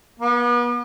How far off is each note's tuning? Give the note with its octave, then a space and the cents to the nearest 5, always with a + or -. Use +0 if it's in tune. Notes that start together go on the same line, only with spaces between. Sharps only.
B3 -40